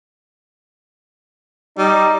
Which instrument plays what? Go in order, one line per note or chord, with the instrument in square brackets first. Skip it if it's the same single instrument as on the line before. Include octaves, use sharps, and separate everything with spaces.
[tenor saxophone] G3 [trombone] D#4